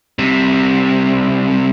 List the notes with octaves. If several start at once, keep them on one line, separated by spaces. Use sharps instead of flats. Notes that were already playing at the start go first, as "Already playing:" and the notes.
C2 C3